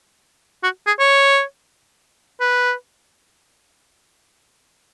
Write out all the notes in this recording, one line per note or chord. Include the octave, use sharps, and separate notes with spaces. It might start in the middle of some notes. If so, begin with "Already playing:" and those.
F#4
G#4
C#5
B4